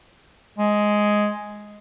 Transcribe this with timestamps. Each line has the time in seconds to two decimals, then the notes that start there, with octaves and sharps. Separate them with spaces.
0.58 G#3